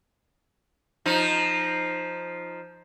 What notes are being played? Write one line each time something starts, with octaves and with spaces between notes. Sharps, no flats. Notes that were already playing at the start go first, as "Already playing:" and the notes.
F3 D#4